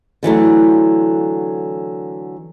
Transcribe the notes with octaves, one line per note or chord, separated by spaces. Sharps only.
D3 E3 F#3 A3